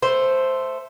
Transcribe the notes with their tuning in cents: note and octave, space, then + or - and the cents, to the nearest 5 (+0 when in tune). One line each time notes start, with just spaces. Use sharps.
A3 +0 C5 +0